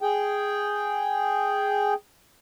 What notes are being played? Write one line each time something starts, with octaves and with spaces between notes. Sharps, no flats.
G#4 G5